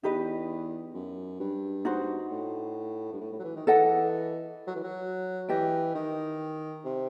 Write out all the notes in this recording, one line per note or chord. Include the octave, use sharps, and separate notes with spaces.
E2 D#4 G4 B4 D#5
F#2
G2
D#4 F#4 C5
A2
G2
A2
A2
F#3
E3
D#3
E3 A4 D#5 F#5
F#3
E3
F#3
E3 G4 D#5 G5
D#3
C3